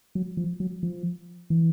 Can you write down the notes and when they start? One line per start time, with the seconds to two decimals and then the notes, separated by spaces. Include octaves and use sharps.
0.15 F#3
0.37 F3
0.60 F#3
0.83 F3
1.50 E3